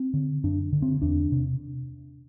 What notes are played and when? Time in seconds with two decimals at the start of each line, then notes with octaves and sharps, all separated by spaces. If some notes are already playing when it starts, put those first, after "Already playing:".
Already playing: C4
0.14 D3
0.44 F#2 D4
0.72 D3
0.82 C4
1.02 E2 D4
1.32 C3